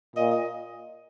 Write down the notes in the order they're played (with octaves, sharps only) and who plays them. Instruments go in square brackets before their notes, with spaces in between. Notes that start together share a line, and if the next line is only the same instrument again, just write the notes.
[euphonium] A#2 [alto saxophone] D#5
[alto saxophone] D#5